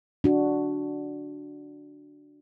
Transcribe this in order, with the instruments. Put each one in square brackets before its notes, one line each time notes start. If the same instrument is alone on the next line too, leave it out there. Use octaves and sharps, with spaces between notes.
[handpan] D4 F#4